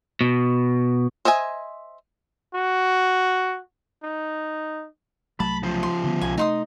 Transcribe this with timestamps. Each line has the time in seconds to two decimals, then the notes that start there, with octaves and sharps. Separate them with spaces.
0.21 B2
1.25 C5 D#5 E5 G#5
2.55 F#4
4.03 D#4
5.40 C2 F#3 A3 A5 B5
5.63 C#3 F3
5.83 C6
6.04 D3 G3 B3
6.21 B1 G#5
6.38 C3 A3 D#4 C6 D#6